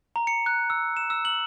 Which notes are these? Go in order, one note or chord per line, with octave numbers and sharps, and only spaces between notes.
A#5
C#7
F#6
E6
E7
E6
F#7